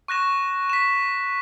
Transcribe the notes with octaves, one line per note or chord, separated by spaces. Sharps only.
C#6 F#6 A#6 E7
B6 E7